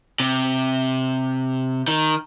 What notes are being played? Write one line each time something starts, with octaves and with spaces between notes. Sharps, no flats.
C3
D#3